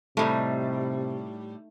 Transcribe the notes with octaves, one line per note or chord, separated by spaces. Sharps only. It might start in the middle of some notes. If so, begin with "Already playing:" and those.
A2 C3 G3 A3 D#4